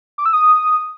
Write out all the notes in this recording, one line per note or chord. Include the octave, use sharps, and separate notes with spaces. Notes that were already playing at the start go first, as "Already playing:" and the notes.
D6
E6
D#6